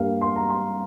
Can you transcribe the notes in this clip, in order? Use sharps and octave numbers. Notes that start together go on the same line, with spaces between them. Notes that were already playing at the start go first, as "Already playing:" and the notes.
Already playing: G2 G3 A#3 F5
C6
A#5
C6